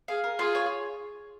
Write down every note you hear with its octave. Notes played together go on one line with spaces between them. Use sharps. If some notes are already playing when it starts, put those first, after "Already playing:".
G#4 F5
A#4
F4 G#4
C#5